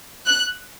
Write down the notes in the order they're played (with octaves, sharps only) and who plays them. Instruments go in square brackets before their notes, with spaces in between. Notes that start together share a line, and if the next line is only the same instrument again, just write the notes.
[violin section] F#6